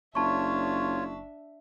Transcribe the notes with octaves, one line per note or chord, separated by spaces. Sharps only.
F#1 D4 F4 C#5 E5 A5 C#6